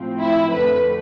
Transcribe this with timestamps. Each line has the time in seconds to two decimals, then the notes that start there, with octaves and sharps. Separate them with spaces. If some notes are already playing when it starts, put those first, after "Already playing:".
Already playing: A2 F3 C4
0.21 E4
0.52 F2 D3 A3 B4